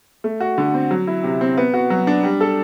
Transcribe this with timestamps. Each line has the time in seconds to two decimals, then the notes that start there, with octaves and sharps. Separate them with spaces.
0.24 A3
0.40 F#4
0.58 D3
0.74 C4
0.91 F#3
1.07 E4
1.24 C3
1.41 C4
1.57 B3
1.74 F#4
1.90 F#3
2.07 D4
2.23 G3
2.40 A4